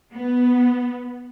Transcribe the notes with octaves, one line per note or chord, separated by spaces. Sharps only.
B3